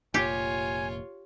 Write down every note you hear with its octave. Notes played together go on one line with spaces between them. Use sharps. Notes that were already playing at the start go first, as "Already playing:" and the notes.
F1 A#2 F4 G4 C#5 G#5